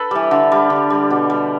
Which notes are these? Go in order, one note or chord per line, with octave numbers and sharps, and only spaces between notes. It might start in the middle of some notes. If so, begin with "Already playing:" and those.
Already playing: A4 B4
E3 G3
D3
G3
D3
G3
B2
G3